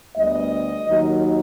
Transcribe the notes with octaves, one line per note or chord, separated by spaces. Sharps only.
D2 D3 G3 B3 D#5
D#2 D#3 F#3